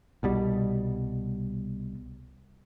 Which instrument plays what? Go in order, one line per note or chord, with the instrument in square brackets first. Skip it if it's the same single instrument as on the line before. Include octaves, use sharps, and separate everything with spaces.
[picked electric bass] C2 B2 G3